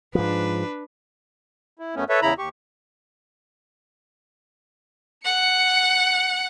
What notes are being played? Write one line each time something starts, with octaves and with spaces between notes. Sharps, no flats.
G#2 F3 D4 B4
E4
F#2 A3 B3 C#4
A4 B4 C#5 E5
E2 C#3 E4 A#5 B5
D#2 G4 C#6
F#5 C#7